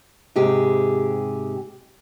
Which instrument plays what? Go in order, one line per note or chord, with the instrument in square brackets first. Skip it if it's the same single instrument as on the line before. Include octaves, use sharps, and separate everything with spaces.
[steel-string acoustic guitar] G#2 C3 G4 G#4